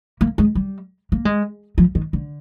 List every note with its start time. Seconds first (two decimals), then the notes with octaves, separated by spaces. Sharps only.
0.21 A#3
0.38 G#3
0.55 G3
1.12 A#3
1.25 G#3
1.78 F3
1.95 D#3
2.13 D3